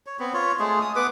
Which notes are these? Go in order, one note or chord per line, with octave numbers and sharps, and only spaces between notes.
C#5
B3 C4
F4 C#5
G#3 A3 G#4
D#6
B3 B4 D6